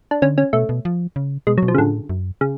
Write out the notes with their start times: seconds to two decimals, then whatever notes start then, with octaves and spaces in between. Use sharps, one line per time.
0.11 D4
0.22 D3 C#4
0.38 C#4
0.53 B2 A3
0.69 B2
0.85 F3
1.16 C#3
1.47 B2 G#3
1.58 F#3
1.63 B2
1.68 F3
1.74 C#3
1.78 A2 D3
2.09 F#2
2.41 C#3